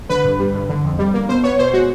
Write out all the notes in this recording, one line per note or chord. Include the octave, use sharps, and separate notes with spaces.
D3 B4
G2
G3
G2
D3
F2
G3
A#3
B2 C5
B3 C#5
B2 C5
G#3 F#4